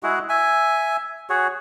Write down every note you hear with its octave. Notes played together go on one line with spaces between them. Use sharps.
G#3 E4 F#4 G#4
E5 G#5
F#4 G#4 C#5